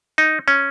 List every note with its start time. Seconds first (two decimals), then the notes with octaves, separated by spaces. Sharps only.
0.18 D#4
0.48 C#4